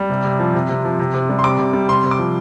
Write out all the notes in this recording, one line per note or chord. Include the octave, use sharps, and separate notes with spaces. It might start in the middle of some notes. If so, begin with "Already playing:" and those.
Already playing: G3
C3
C3
F3
C3
C3
F3
C3
C3
G3
C6
C3 D6
C3
G3
C3 C6
C3
D6
F3